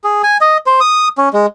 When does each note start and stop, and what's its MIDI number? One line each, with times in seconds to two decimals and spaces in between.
0.04 0.22 68
0.23 0.37 80
0.41 0.57 75
0.66 0.80 72
0.81 1.08 87
1.18 1.29 61
1.33 1.46 56